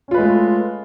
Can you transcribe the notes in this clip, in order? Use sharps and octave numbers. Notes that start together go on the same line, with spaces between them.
G#3 A3 C#4 F4 B4